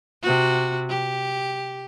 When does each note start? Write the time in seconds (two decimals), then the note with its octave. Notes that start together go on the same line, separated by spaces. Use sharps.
0.22 C3 F#4
0.90 G4